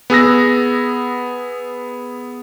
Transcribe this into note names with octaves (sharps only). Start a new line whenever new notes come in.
B3 G#4 E6 A#6